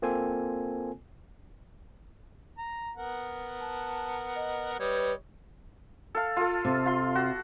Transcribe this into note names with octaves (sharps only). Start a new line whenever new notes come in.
A#3 C4 F4 A4 G#5
A#5
B3 A#4 F#5
A5
D#5
G3 B4 C#5 D#5
A4 F5
F4 A4
C3
F4 C6
F#4